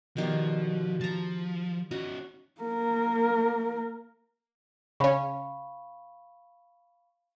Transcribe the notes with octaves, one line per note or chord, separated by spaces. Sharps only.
B2 D#3 F3 G3
F3 A5 A#5
C#4 D#4 F#4
A#3 A#4
C#3 C#4 F5 B5 C#6